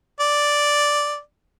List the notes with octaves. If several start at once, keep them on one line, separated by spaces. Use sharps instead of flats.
D5